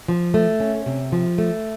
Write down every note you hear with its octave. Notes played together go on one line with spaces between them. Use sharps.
F3
A3
C#4
C3
F3
A3